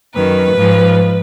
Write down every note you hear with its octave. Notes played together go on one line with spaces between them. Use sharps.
F#2 D#3 B4
G#2 F3